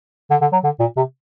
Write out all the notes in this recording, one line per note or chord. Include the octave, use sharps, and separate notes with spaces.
D3
D3
F#3
D3
A#2
C3